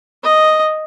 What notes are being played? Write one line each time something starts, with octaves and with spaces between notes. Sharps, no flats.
D#5